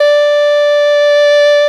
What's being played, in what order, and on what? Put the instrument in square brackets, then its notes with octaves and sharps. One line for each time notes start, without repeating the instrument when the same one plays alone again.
[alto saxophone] D5